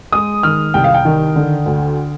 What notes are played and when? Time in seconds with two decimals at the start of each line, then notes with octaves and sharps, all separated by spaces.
0.12 G#3 D#6
0.43 D#3 F6
0.74 C2 G5
0.84 F5
0.94 G5
1.05 D#3
1.36 D3
1.66 D2